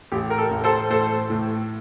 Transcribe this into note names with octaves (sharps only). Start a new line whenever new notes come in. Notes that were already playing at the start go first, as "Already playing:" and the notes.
A1 G4
A#4
A4
A1
A4 C5
A2 A4 C5
A2